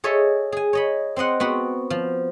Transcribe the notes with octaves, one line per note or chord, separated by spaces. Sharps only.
G#4 A4 C#5 D#5 E5
G#4 G#5
C#5 D#5 B5
C4 C5 D#5 F#5
B3 C4 F#4
F3